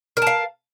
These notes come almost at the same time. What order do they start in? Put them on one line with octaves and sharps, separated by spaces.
A#4 A5 F5